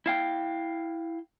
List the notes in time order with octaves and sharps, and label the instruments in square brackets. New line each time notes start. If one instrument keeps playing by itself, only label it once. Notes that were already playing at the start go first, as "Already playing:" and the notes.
[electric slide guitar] E4 F5 G5